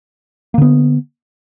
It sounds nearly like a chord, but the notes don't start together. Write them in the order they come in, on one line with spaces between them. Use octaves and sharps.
A#3 D3 B3